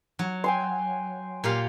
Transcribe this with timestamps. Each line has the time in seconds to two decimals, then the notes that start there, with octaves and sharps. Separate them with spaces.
0.19 F#3
0.44 G5 G#5 C6
1.44 A#2 G4 F5